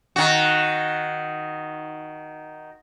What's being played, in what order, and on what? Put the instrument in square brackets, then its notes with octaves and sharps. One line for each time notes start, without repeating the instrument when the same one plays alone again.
[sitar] D#3 F#4